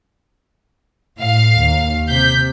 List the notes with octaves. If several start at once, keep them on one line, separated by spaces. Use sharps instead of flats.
A2 F5
D#2
C3 G6 B6